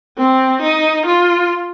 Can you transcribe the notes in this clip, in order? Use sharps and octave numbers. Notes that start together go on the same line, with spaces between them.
C4
D#4
F4